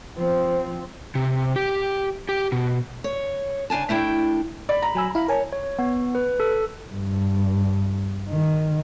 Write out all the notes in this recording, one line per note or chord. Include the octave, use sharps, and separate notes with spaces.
F3 C4
C3
G4
G4
B2
C#5
C#3 D4 G#5 A5
A3 D4 E4 G5
D5 B5
A#5
F#3 G#5 E6
E4 F5 B5
A#4 C#5 G#5 A5
C#5
B3
B4
A4
G2
D#3